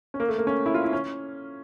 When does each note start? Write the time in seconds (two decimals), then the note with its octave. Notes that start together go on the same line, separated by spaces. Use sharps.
0.14 C#4
0.20 A#3
0.29 A3
0.38 A#3
0.47 C#4
0.66 E4
0.74 F4
0.84 E4
0.93 C#4